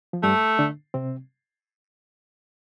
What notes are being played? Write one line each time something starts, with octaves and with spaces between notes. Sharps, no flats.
F3
G2 G3 A3
D3 D4
C3 C4